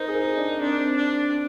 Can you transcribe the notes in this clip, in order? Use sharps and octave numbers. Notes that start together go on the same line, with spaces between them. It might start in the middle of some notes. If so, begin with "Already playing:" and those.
Already playing: D#4 A#4 C5
G#4
A#4
D4
C4 D4
D4